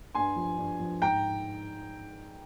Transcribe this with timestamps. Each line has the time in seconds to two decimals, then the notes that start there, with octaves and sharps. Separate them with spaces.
0.15 G2 G#5 C6
0.36 F3
0.58 G2
0.80 F3
1.02 G#2 G5 A#5